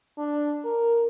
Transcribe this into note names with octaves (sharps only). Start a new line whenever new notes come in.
D4
A#4